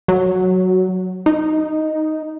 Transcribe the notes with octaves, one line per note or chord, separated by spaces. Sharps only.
F#3
D#4